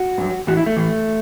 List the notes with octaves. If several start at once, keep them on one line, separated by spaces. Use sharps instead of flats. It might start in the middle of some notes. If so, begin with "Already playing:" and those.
Already playing: F#4
G2 F#3
A2 E3 F#4
E4
A3
A2 E3